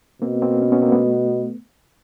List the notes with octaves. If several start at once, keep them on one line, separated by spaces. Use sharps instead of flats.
B2 A#3 C4
A#3 C4
B3 C#4
B3 C#4
A#3 C4
A3 B3